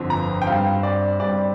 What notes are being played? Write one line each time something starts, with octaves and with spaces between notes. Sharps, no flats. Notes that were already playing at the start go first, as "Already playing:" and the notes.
Already playing: G1 F2 D3 F3 C4
A#5
G5
G2 G3 C4 F5
D5
G2 G3 C4 D5